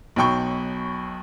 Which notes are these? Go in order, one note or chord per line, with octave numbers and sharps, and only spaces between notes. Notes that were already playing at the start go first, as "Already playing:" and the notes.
B1 B2 F#3 G5 B5 C#6